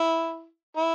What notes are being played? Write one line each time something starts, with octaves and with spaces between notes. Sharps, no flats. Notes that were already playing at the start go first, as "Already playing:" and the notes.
Already playing: E4
E4